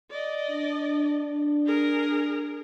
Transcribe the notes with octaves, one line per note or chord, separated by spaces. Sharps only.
D5 D#5
D4
G#4 A#4